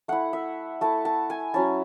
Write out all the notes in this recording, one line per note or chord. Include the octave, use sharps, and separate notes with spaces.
A3 E4 F#5
E5
A3 E4 A5
A5
G#5
F#3 C#4 E4 A5